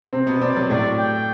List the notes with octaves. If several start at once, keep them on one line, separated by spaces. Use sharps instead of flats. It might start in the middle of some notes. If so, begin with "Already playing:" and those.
C3 C4
B2 B3
C3 C4 D5
F#3
A2 A3 D5
G5